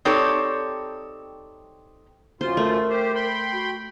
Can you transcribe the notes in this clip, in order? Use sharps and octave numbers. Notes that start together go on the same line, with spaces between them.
C4 D#4 G4 A4 C#5 D5
F#2 F4 F#4 C5
A3 A#4
G4 C5
G5 B5 C6
F#4